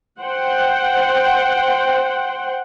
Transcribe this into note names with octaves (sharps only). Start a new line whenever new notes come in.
C5 F#5 G5